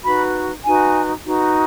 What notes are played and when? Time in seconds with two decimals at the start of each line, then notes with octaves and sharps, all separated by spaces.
0.02 D#4 F#4 B4 B5
0.64 D#4 F#4 B4 G#5
1.24 D#4 F#4 B4